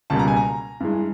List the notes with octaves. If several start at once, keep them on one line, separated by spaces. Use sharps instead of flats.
C#2 B2 G3 A#3 A5
A#5
G#5
A#5
G2 E3 G#3